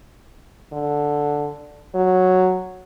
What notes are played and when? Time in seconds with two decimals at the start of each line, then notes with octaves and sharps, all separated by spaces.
0.72 D3
1.95 F#3